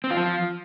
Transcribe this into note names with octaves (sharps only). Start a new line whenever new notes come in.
C4
F4
F3